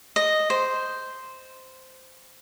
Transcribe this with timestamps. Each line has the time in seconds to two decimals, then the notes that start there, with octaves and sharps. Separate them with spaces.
0.16 D#5
0.50 C5